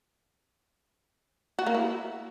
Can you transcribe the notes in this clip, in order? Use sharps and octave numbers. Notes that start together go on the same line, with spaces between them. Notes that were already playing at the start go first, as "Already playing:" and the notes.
F#4
A#3
E4